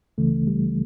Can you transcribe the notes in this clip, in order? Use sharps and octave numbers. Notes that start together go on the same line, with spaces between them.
C#2 C#3 E3 A3
G3